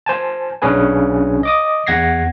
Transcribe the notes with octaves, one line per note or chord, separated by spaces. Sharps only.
C5 G#5 A5
B1 C#4 D4 G#4 B4 G#5
D#5 D6 D#6
E2 F#5 G#6 A#6 C7